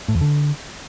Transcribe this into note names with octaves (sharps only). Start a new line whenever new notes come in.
A2
E2
D3